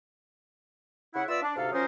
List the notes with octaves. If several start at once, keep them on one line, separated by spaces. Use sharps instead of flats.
C#3 E4 F#5
B3 F4 D5 E5 E6
D4
D2 G#2 C3 A4 F5
F3 F#3 C#4 D#4 A#4 C5